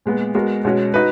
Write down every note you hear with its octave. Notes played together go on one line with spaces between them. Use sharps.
A#2 G#3 B3
G#3 B3 F#4 A#4
B2 G#3 C#4 F#4
D#4 F#4 B4